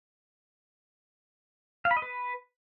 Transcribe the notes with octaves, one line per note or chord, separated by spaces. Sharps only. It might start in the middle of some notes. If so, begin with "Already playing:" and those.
F5
B5
D#5
B4